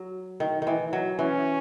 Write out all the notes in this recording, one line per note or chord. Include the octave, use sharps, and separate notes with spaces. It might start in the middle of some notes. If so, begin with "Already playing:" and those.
Already playing: F#3
D#3
D#3 E3
F#3
E3 C#4